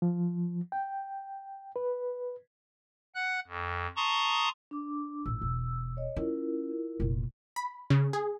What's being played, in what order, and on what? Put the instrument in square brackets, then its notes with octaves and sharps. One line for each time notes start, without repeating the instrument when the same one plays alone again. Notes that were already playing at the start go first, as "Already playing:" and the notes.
[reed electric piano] F3
G5
B4
[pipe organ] F#5 F#6
F2
A5 A#5 C6 C#6 D#6
[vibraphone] D4 D6
[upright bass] A1 A#2 [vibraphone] E6
[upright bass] E1
[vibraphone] C#5 D#5
[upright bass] C#4 [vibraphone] E4 F4 A#4
[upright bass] F1 A#2
[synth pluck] B5
C#3
G#4